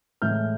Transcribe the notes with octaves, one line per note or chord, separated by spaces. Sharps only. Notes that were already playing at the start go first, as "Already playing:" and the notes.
A2 E3 G#3 F6 G6